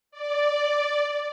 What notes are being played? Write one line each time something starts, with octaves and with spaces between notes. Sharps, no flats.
D5